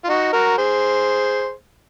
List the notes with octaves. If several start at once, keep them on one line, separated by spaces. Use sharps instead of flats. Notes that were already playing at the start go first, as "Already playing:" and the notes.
F4
D#4 F#4
F#4 A#4
G#4 C5